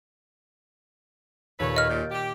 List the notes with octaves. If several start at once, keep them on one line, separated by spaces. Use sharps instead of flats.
D#2 A#2 A4 B4 C#5
D#5 F6
A#2 G6 A6 D7
G4